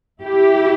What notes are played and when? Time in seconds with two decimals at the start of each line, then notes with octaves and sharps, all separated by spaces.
0.23 E4 G4